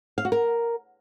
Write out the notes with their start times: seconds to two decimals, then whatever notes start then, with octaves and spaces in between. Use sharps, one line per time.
0.18 F5
0.25 F#4
0.32 A#4